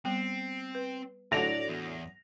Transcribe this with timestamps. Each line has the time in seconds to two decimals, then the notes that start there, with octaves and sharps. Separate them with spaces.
0.05 G3 B3 C4 G5
0.75 B4
1.32 A2 D3 F#3 D5 A#6 F7
1.68 E2